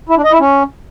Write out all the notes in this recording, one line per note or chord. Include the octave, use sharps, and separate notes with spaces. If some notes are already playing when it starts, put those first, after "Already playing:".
E4
D4
D#5
E4
C#4